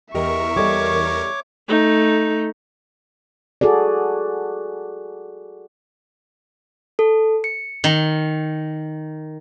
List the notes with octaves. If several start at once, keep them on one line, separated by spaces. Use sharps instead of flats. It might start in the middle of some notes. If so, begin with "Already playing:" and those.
E2 G4 A#4 D#5 E5 C#6
G3 A4 C#5 D#5 D6
A3 D#4
F#4 G#4 A4 D5
A4
C#7
D#3